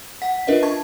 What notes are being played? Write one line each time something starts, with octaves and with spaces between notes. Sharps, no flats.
F#5 B6
D4 F4 A#4 B4 D#5 E5
A5 C#6 G#6